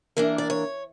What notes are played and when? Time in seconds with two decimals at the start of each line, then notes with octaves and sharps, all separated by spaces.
0.17 E3 A#3 D4 A#4
0.38 D5
0.50 C#5